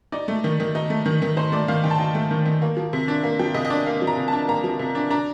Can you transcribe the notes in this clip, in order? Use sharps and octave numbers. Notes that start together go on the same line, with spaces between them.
D#4 D5
A3
D#3
D#3
D#4
A3
D#3
D#3
D#4 C5
A3 D5
D#3 F5
D#3 G5
A5
D#4 G5
A3
D#3
D#3
A#3
F3
C3
D4
A#3
F3 G5
C3 D#5
D#5
D4 D5
A#3 F5
F3
A#5
C3
A5
D4
A#3 A#5
F3
C3
D4
D4 A#5